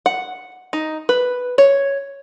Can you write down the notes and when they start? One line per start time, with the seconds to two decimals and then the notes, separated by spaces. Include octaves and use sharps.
0.06 F#5
0.73 D#4
1.09 B4
1.58 C#5